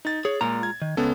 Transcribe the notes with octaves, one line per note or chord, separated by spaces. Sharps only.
D#4 A6
G#4 C#5
A#2 G#3 F4 A#5
G#6
D#3
C#2 B3 C#4 A4